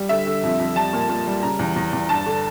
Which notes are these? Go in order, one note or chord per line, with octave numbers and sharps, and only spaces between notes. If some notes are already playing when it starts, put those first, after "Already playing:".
Already playing: G3
D3 E5
D3
F2
F2
G3 A5
A#2
A#2
G3
C#3 A#5
E2
E2
E2
G2 A5
D3